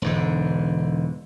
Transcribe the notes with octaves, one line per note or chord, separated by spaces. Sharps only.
E1 G#2 D3